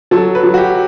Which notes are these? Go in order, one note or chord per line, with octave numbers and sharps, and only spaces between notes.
F#3 A4
B4
F#3
F#4
G4